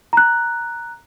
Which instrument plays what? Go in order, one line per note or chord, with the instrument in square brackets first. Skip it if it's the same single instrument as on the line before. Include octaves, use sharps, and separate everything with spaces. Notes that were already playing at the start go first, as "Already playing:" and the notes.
[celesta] A#5 F#6